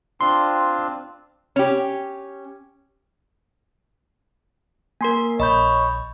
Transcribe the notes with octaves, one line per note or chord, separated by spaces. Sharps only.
C4 D4 F4 C6
C#4 G4
A#3 A#4 G#5 C6
A#1 C#5 D#5 B5 G6